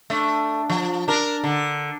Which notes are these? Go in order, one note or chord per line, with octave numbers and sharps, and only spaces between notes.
A3 D4
F3
D4 A#4
D3